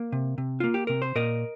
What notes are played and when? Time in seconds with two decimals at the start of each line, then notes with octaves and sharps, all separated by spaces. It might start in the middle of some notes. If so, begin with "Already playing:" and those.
Already playing: A#3
0.12 C3
0.38 C3
0.60 A#3 F4
0.74 G4
0.87 C3 A#4
1.02 C5
1.15 A#2 A#4 D#5